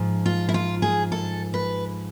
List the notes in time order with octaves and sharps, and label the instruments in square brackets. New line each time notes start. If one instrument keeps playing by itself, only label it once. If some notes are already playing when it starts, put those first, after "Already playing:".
Already playing: [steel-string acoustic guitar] G#2 F3
F4
E4
F4
G#4
A4
B4